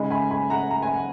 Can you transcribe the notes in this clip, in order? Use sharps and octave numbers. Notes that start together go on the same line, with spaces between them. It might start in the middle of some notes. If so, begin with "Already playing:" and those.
Already playing: C#3 G#3 D#4 G#5 B5
G#5 B5
G#5 B5
F#5 A#5
A#5
G#5
F#5